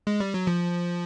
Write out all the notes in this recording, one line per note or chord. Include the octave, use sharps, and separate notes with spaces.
G#3
G3
F#3
F3